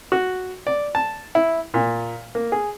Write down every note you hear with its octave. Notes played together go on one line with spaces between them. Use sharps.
F#4
D5
A5
E4
A#2
A#3
G#4